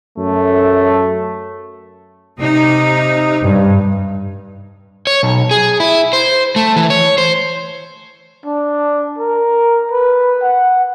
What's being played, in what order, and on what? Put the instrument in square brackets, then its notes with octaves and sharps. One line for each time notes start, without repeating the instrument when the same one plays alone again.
[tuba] F#2 [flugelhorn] A3
[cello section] C3 D#4
[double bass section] G2
[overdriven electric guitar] C#5
B1
G#4
E4
C5
A3
E3
C#5
C5
[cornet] D4
A#4
B4
F#5